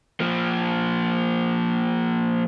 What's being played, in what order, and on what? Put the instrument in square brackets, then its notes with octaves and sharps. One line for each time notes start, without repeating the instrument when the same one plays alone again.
[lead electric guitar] F3 A#3